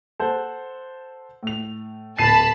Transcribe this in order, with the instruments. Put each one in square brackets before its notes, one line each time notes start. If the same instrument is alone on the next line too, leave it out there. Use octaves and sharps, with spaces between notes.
[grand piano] A4 C5 F#5
A2 F7
[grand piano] D1 C7 D#7 [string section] A5 B5